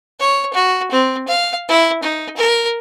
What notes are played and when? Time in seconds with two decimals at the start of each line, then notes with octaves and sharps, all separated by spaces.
0.20 C#5
0.53 F#4
0.91 C4
1.28 F5
1.69 E4
2.03 D#4
2.37 A#4